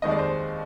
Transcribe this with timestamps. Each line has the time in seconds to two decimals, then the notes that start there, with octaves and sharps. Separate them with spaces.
0.02 F1 D#2 D#3 G#3 D#5
0.11 D5
0.19 C5